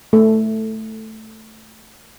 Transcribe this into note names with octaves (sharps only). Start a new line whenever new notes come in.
A3 A4